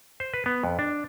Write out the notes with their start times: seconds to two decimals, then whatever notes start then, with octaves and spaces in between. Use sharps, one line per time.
0.20 C5
0.34 B4
0.46 B3
0.64 F2
0.79 D4